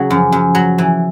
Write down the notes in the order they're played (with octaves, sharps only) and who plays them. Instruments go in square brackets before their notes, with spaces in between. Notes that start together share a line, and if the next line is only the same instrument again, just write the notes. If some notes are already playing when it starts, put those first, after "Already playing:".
Already playing: [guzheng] C#3 F#3
[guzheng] F#2 [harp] F3
[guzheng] F#2
F#3
E3